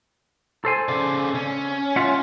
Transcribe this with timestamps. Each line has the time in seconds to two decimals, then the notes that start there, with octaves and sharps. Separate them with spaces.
0.65 A4 C5 G#5
0.89 C#3 D5
1.35 C#4
1.96 F4 E5 F#5